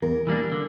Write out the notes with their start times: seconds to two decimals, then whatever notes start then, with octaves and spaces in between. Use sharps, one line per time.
0.02 E2 A#4
0.27 E3 G3 A#3 D4
0.52 D3